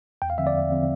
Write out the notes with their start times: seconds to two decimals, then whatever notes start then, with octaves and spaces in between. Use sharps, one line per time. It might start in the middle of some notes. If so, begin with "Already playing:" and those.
0.22 E2 G5
0.30 F5
0.38 D3 F3 C4 E5
0.47 D5
0.55 E2
0.72 D3 F3 C4